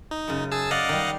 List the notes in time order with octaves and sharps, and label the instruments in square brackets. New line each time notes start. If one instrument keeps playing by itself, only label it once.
[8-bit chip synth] D#4
[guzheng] F#2 C#3
[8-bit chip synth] G#4 A5 E6
[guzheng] D5 [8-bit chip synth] D#5 F5 F#5
[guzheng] D#3 G3